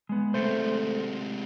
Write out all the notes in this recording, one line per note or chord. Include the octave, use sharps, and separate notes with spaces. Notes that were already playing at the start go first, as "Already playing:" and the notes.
G#3 B3
C3 G#3 A3 C5